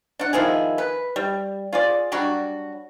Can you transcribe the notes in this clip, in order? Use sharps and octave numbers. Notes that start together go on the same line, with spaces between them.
D4 F#5
D#3 F3 E4 G#4
B4
G3
F4 G#4 D5
F#3 G3 D4 F#4